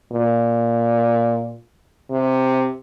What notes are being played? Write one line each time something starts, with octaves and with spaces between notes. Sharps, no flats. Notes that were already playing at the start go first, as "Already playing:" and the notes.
A#2
C3